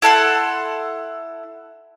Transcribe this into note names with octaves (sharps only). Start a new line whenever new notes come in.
E4 A4 F#5 C6